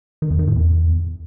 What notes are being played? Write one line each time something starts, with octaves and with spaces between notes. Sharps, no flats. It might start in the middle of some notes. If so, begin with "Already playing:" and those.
D#3
E2
D#3
A2
E2